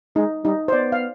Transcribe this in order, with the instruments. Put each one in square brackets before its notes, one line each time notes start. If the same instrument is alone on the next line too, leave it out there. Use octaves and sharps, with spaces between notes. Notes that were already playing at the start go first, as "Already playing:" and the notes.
[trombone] G#3 [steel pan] D#4
[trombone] G3 [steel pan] D#4
[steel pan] C5
[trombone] B3 [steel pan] D5
[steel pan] F5